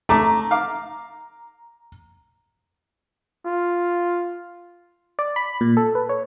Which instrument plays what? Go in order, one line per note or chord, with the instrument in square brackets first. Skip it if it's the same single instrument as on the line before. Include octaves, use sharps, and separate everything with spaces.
[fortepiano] A3 D6 [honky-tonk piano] A#5
[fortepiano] F5 D6
[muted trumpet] F4
[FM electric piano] D5
B5
A#2
A4
B4
C#5